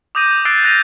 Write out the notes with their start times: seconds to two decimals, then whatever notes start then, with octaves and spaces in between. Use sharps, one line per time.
0.15 D6 D#6 G6 A#6 D#7
0.45 E6 F#6 A6 C7 D7
0.64 E6 F#6 G6 A#6 D#7 F7